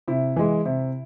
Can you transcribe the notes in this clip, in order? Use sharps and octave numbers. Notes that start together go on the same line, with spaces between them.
C3 E4
E3 G#3
C3